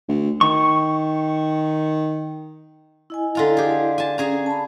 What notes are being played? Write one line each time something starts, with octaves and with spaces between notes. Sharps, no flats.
D2
D#3 C#6
E4 D#5 G#5
D3 F4 A#5
G4 G#4
G#5 A5
C#4 G#4 G#5 A#5
A5 B5